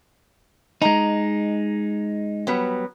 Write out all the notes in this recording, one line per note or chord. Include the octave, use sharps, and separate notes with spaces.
G#3 D#4 D#5 A#5
F#3 G3 B3